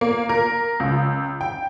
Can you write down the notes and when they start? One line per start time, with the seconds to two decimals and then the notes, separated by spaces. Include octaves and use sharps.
0.01 A#3
0.29 A#4
0.80 C#2
1.41 G5